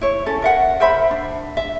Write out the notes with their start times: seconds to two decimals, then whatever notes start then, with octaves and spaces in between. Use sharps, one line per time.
0.01 E4 C#5
0.26 C#4 A4
0.42 A#4 E5 F#5
0.80 A#4 C5 E5 B5
1.11 D4
1.57 E5